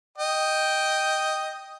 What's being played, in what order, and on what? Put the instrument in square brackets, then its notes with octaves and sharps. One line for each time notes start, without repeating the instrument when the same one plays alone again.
[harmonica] D#5 G5